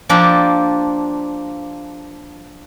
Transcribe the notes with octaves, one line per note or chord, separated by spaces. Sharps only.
F3 A#3 D4 G4 A4